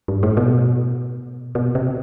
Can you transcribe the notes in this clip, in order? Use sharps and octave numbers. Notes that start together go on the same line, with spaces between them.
G2
A2
B2
B2
C3